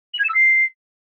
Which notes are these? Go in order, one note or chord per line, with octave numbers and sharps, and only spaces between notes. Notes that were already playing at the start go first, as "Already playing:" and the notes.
F#7
G#6
E7
E6
C7